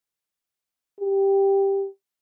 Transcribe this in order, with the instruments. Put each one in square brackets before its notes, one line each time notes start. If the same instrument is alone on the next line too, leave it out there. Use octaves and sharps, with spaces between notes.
[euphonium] G4